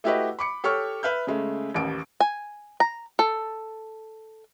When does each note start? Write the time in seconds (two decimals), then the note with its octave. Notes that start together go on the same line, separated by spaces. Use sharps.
0.04 A3 E4 F#4 G4 B4 D#5
0.39 B5 D6 C#7
0.64 G4 A4 C#5 C#6 F6
1.03 B4 E5 F6 G6
1.27 C#3 G#3 A3
1.74 A1 D#2 D7
2.20 G#5
2.80 A#5
3.19 A4